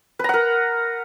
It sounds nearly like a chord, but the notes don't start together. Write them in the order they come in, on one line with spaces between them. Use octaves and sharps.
B4 A#5 F#5 A#4